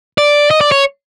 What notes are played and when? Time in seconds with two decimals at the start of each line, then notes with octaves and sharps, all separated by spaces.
0.18 D5
0.51 D#5
0.61 D5
0.72 C#5